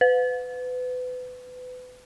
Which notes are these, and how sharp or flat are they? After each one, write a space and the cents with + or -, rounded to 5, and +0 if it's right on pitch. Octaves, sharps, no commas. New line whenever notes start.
B4 +30